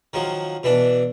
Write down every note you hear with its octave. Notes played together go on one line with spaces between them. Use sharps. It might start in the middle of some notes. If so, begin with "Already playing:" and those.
D#3 F3 F#3
B2 E3 D4